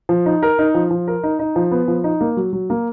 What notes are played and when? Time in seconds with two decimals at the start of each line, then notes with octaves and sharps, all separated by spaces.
0.09 F3
0.26 D#4
0.43 A#4
0.59 D#4
0.74 F3
0.91 F3
1.08 A#4
1.23 D#4
1.39 D#4
1.56 F3
1.72 B3
1.88 F3
2.04 D#4
2.21 A#3
2.37 F#3
2.53 F#3
2.70 A#3